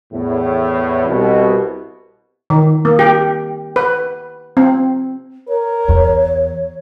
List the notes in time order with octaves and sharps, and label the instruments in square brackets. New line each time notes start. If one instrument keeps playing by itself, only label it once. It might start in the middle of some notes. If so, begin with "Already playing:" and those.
[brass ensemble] E2 A2
C2 B2
[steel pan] D#3
A#3
G4
B4
C4
[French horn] A#4 [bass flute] C#5
[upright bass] E2